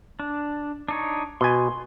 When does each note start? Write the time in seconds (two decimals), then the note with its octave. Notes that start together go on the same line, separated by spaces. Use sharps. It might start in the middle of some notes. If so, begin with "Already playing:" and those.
0.20 D4
0.88 D4 D#4 C#5
1.41 B2 G#5 C6